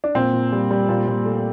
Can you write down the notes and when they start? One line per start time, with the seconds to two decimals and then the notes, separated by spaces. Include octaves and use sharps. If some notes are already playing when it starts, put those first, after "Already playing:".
0.04 D4
0.15 A#2 C4
0.33 A#2
0.52 G3
0.71 G3
0.89 A#2
1.07 A#2
1.25 A3